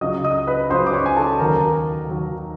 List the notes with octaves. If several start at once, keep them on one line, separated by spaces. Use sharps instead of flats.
C#2 C#3 F#3 D#5 D#6
D#5 D#6
B4 B5
C#2 C#3 F#3 C5 C6
D6
C#5 C#6
G#5
A4 A5
D#2 D#3 F#3 A#4 A#5
D#2 D#3 F#3